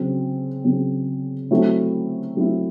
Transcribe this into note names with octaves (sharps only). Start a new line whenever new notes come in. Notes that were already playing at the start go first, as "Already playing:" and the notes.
Already playing: C#3 F#3 C4
C#3 F#3 C4
F#3 A3 C4 E4
F#3 A3 C4 E4